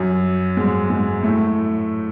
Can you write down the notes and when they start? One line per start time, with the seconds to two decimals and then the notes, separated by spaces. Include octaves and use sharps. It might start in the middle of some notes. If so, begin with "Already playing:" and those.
Already playing: F#2 F#3
0.57 G#2 G#3
0.90 G#2 G#3
1.23 A2 A3